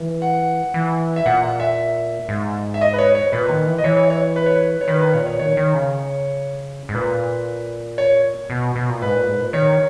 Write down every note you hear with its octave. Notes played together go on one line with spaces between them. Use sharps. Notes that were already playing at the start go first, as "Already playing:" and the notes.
Already playing: E3
F#5
E3
E5
A#2 F#5
F#5
E5
G#2
E5
D#5
B4
C#5
C#5
A#2 B4
D#3
E3
D#5
E3 C#5
C#5
C#5
B4
C#5
B4
C#5
D#3 B4
B4
A#2 C#5
C#5
D#3 C#5
D#3
C#3
G#2
A#2 B4
C#5
B2
B2
A#2
G#2 B4
A#2
G#2
A#2
D#3 C#5